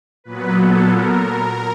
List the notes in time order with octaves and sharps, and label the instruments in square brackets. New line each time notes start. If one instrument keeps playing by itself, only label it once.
[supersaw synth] A#2 F#3 B3 B4
A4
A#4